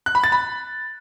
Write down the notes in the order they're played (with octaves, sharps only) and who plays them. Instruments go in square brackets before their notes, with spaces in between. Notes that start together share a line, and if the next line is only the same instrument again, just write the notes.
[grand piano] F#6
B5
A6
B5